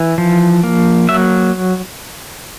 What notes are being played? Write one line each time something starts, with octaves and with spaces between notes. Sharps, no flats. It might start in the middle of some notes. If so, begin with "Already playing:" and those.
Already playing: E3
F3
A#3
F#3 E5